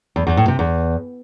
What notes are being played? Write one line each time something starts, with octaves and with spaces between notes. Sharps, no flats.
E2
E2
A2
C3
E2